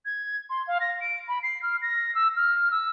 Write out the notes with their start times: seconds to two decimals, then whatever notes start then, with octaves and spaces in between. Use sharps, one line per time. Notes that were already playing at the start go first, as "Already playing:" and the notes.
0.05 G#6
0.50 C6
0.67 F5
0.81 A#6
1.01 D7
1.28 B5
1.43 C7
1.62 F6
1.82 A#6
2.15 E6
2.36 F6
2.71 E6